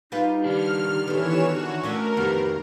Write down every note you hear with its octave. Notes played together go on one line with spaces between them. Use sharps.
G3 D#4 F4 B4
D#3 D4 G4 F6
E3 B3 A4 C#5 E7
F#4
A3 C#4 D4 A#4
F2 D#3 B3 G4